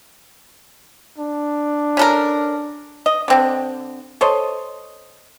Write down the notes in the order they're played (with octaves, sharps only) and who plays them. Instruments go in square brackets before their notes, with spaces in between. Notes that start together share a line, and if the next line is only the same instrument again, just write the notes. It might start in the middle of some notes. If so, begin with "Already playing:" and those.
[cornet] D4
[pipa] C#4 A4 A#4
D#5
D3 C4 D4
A4 C5 C#5 D#5